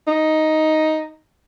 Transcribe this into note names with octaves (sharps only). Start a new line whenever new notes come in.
D#4